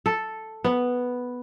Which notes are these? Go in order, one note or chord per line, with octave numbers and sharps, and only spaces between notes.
A4
B3